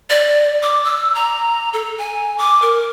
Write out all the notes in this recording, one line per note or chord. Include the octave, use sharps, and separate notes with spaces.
D5
D6
E6
A#5
A4
G#5
D6
A#4